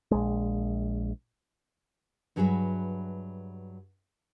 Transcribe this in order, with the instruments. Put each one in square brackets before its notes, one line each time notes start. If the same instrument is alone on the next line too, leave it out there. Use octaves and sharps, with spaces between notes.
[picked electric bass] A#1 G#3
[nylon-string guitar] G2 F#3 F#4 G#4 B4 E5